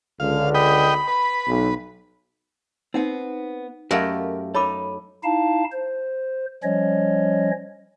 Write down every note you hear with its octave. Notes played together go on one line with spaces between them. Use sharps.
C#2 D3 F5
D#5 G5 B5
B4
B1
B3 C4 D#4 F#5
F#2 A3 G4 A4 A#4 D#5 F5
D#4 A4 C#5 B5 D6
D#4 E4 F5 A5
C5
F3 G3 C#4 C#5 D#5